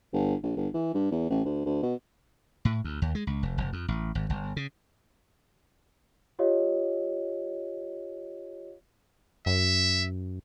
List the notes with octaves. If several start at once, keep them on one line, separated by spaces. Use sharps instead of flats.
G1
A#1
G1
E3
G2
E2
A1
D2
D2
B2
A2
D2
D#2
G#3
C#2
F1
F1
F2
A1
G#1
G1
C#3
F4 G4 C#5 D#5 F5
F#2 E5